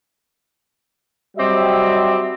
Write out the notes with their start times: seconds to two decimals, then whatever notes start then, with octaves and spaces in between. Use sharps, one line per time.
1.37 F#3 G3 C4 G4 D#5 E5